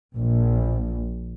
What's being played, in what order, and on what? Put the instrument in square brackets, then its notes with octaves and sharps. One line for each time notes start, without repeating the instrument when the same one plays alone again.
[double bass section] A#1